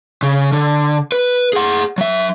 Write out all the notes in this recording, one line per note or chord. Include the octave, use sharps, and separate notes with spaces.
C#3
D3
B4
G#4 F#5
F#3 E5